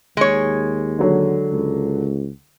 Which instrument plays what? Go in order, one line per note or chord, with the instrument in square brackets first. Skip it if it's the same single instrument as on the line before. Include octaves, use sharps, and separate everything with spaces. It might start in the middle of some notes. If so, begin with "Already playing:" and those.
[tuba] D#2 [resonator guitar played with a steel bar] G#3 C#5
[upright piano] D3 F#3
[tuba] C#2